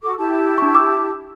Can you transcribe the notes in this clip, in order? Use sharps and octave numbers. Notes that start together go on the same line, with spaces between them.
F#4 A4 D6
E4 G4 A5
D4 C#6
D6 E6